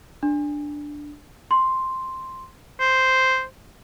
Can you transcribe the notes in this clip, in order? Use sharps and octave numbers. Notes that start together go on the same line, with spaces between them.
D4
C6
C5